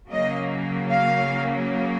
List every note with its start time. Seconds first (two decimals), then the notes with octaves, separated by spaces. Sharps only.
0.10 C#3 F#3 A#3 D#5
0.91 F5